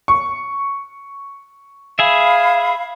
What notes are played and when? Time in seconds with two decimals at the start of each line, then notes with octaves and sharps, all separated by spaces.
0.08 C#6
1.99 G#4 E5 F5 B5